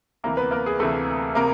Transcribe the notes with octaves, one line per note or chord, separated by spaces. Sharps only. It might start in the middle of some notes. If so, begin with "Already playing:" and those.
D2 C3 E3 A#3 A#4
B3 B4
A#3 A#4
G#4
D2 C3 E3 A3 A4
C3 A#3 A#4